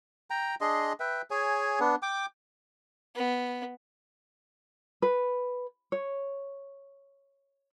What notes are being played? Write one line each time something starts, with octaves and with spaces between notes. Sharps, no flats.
G5 A#5
D4 G#4 D#5 C6
B4 E5 G5
G#4 C#5 G#5
B3 D4
G5 D6
B3
B4
C#5